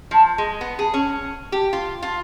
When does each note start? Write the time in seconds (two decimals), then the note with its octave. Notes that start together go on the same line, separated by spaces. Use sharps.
0.11 F3
0.38 G#3
0.61 B3
0.79 G#4
0.94 C#4
1.52 G4
1.73 F4
2.03 F4